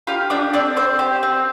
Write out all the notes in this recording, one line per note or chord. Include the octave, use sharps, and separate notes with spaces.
F4 G4 F5
D4 G4 D5
C4 D4 D5
C4 C5
G4 C5
C4